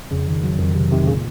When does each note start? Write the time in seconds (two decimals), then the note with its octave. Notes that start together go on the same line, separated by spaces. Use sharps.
0.11 F2 C#3
0.28 D#3
0.43 F#3
0.59 F2 D#3
0.75 F2 C3
0.91 C3 D#3
1.07 A#2 C#3